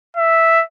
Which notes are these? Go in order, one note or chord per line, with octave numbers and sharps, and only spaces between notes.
E5